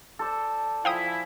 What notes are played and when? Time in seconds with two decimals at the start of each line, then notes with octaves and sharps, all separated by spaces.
0.19 A4 C5 D5
0.85 F3 E4 F5 G5 G#5 D#6